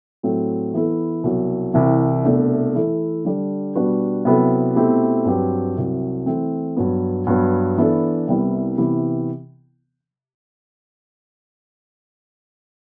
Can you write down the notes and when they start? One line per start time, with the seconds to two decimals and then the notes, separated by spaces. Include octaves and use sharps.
0.23 A2 F#3 A3 C4
0.74 E3 B3 E4 A4
1.23 C2 B2 F#3
1.74 C2 C3 E3
2.24 C2 B2 A3 D4
2.74 E3 A3 E4 A4
3.25 D3 G3 D4
3.75 B2 G3 D4 F#4 B4
4.25 C3 F#3 B3 E4 A4
4.76 B2 A3 C4 E4 G4
5.26 G2 F#3 C4 G4 B4
5.76 C2 C3 F#3
6.26 E3 A3 C4
6.76 G2 F#3 B3
7.27 G2 F#3 B3
7.78 E3 B3 D4 A4
8.28 C2 C3 G3 B3 E4
8.78 C3 E3 B3 E4 G4